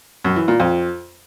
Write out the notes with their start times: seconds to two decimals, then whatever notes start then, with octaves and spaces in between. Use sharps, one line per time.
0.25 F#2
0.36 E3
0.48 A#2
0.60 F2